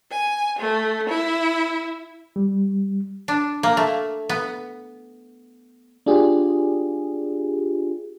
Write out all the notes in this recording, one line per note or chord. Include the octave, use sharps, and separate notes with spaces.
G#5
A3
E4
G3
D4
A#3
A3
B3
D4 F4 G4 G#4